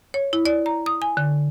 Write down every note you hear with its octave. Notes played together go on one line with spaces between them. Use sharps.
C#5
E4
D5
A#5
D#6
G#5
D3